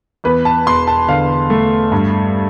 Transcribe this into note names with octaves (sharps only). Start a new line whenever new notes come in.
E2 B4
A5
E1 C6
A5
D3 F5
A3
G2